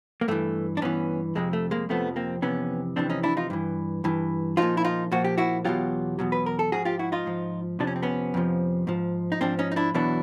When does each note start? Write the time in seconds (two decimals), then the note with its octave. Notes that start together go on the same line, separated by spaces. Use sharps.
0.21 A#3
0.28 G2 E3 A3
0.77 D4
0.82 G2 E3 B3 C#4
1.35 F2 C3 F3 G#3
1.53 A3
1.71 G#3 A#3
1.89 F2 C3 F3 A3 B3
2.16 A#3 C4
2.42 F2 C3 E3 B3 C#4
2.96 F2 C3 E3 C4 D4
3.10 C#4 D#4
3.23 D4 E4
3.37 D#4 F4
3.50 G2 E3
4.04 G2 E3
4.57 A#2 F3 D#4 F4
4.77 E4
4.84 D#4 F4
5.12 A#2 F3 F#4
5.25 G4
5.38 E4 F#4
5.65 E2 B2 F#3 F4 G4
6.19 E2 B2 F#3
6.32 B4
6.46 A#4
6.59 A4
6.72 G#2 F3 F#4 G#4
6.85 F4 G4
6.99 E4 F#4
7.12 D#4 F4
7.26 G#2 F3
7.79 F2 C3 F3 D4
7.87 C#4
7.96 C4
8.03 B3 C#4
8.34 F2 C3 F3
8.87 G#2 F3
9.32 D#4
9.41 G#2 F3 C4 D4
9.59 C#4 D#4
9.72 D#4
9.76 D4 E4
9.94 E2 B2 F#3 D4 E4